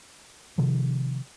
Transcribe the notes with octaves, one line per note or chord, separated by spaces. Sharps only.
C3 D#3 F3